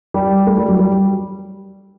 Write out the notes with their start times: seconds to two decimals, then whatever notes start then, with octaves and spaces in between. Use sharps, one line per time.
0.14 G3
0.47 A3
0.58 G3
0.68 F#3
0.79 G3